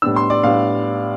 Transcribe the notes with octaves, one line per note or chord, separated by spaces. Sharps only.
A2 G3 B3 D4 E6
C6
D5
A2 G3 B3 D4 F5